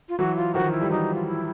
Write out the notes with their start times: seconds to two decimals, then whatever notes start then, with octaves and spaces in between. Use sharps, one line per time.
0.09 F4
0.19 E3 F#3 F#4
0.36 F4
0.54 D#3 F3 F#4
0.72 E4
0.82 G3
0.90 E3 F#3 D#4
1.15 F4
1.26 E4